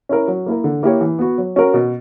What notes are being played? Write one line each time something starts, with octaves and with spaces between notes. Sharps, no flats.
C#4 E4 A#4
F#3
A#3 E4 A#4
D3
A#3 E4 G4 C#5
E3
B3 F#4
F#3
C#4 F#4 A#4
B2